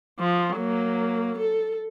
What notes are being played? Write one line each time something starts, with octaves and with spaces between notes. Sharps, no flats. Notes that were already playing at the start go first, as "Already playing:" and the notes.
F3
F#3 A#3
A4